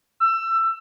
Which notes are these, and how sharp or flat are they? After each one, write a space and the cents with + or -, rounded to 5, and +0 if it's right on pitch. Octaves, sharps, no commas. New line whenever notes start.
E6 +25